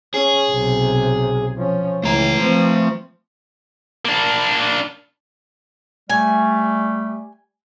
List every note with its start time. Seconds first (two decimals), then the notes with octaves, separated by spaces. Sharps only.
0.14 C#4 G#4
0.49 B1 C3
1.57 F3 C#4
2.04 C#2 E3 A3 A#5
2.41 F3 C4
4.05 A#3 D4
6.10 G3 A3 G#5